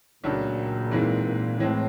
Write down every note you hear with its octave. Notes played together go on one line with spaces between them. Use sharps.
C#2 A#2 C#3 F#3 A3 D4
G#2 E3 G#3 C4 F4
A#2
A2 E3 G#3 C4